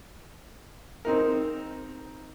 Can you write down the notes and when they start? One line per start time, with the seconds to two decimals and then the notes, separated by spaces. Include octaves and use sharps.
1.05 C4 D#4 A#4